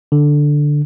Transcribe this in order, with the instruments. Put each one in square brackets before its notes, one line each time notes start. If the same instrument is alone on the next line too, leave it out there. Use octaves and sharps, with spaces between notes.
[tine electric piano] D3